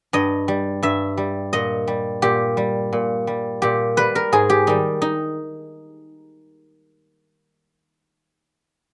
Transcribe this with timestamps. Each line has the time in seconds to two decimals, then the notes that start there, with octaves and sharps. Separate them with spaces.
0.13 G2 D#5
0.48 G3
0.83 G2 E5
1.17 G3
1.53 A#2 D#5
1.88 G3
2.22 A#2 G4
2.57 G3
2.93 A#2
3.27 G3
3.62 A#2 G4
3.97 G3 B4
4.15 A#4
4.32 G#2 G#4
4.50 G4
4.67 D#3 G3 D#4
5.02 D#4